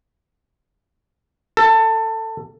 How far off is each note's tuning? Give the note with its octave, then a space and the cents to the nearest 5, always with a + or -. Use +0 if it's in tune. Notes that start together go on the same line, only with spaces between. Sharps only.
A4 +20